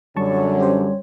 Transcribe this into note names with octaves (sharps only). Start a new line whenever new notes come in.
F#2 D3 G3 C#5 A5 C#6
C#4 G4 C5